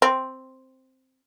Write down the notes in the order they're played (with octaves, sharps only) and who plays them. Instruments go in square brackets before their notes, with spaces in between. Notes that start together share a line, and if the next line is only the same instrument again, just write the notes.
[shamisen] C4